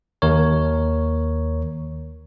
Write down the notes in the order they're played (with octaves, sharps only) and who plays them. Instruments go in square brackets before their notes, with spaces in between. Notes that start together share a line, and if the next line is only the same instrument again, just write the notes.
[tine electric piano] D#2 A#4 C#5